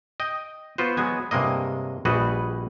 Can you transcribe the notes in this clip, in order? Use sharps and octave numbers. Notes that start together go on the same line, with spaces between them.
D#5 G5
B3 F4 F#4 B4 C5
F#3 G#3 B3 G#5
G2 C3 G#3 A#3 D#5
A#1 G3 F#4 G#4 B4 D#5